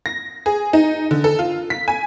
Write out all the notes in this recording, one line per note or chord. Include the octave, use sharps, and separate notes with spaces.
A#6
G#4
D#4
D3
A4
F4
B6
G#5